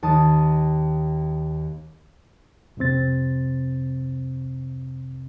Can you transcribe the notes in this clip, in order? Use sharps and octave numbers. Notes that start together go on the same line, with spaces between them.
D#2 A5 D#6
C2 F2 C3 C4 A6